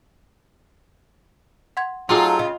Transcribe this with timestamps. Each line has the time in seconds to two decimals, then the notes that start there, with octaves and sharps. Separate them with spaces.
1.77 F#5 C6 G#6
2.09 F#3 D#4 F4 F#4 G#4 A4 G5 D6
2.39 C#3 D#5